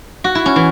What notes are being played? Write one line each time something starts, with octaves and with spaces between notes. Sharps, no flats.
F#4
E4
C#4
E3